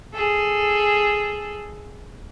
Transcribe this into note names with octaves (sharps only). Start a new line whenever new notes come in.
G#4 A4